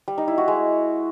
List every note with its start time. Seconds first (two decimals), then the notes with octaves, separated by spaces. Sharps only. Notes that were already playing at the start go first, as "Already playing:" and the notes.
0.08 G3
0.18 D#4
0.28 E4
0.38 F#4
0.48 G#3